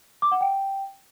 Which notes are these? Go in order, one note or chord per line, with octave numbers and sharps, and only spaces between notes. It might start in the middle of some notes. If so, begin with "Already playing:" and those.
D6
F#5
G5